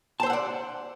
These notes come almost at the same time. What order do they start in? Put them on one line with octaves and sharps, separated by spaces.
A5 C5 E5 F#5 D5